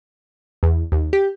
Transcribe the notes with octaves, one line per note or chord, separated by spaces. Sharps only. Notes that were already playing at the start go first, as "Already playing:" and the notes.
E2
D#2
G4